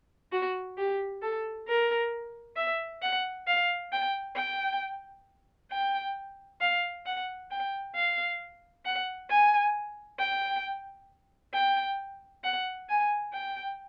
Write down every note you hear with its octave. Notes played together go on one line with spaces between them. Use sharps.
F#4
G4
A4
A#4
E5
F#5
F5
G5
G5
G5
F5
F#5
G5
F5
F#5
G#5
G5
G5
F#5
G#5
G5